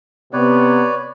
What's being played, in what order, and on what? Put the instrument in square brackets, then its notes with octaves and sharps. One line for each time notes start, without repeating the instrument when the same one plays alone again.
[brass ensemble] C3 B3 [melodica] B4 C#5 D5